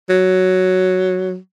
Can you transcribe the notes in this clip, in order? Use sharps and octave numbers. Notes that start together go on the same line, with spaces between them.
F#3